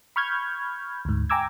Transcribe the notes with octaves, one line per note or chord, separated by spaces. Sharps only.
B5 C#6 F6 G6 G#6
D2 G#2
G5 G#5 A#5 D6 E6 G#6